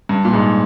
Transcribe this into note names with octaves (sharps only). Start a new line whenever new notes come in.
G2
A#2
G#2